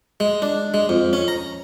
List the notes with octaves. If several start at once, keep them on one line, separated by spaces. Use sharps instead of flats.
G#3
D4
G#3
F2
C#4
A#5